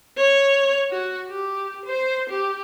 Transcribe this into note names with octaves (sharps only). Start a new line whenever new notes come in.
C#5
F#4
G4
C5
G4